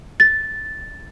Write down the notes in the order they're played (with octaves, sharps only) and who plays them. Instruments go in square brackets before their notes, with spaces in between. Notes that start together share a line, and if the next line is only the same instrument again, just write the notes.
[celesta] A6